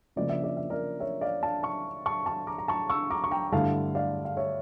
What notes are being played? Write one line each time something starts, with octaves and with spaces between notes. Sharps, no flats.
C#3 F3 A#3 D5
E5
D5
E5
A#4 D5
C#5 E5
D5 F5
F5 A5
A5 C#6
A5 C#6
A5 C#6
A#5 D6
A#5
A5 C#6
C#6 E6
A#5 D6
C#6
G5 A#5
G2 D3 A3 E4 F5 A5
D5 F5
F5
C#5 E5